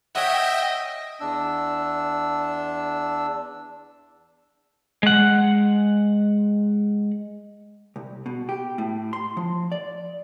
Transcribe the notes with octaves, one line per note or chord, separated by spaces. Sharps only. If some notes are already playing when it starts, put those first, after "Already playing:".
C#5 D#5 E5 F#5 G5
E2 D4 E6
G#3 F#5
C2
B2
G4
A2
C6
F3
D5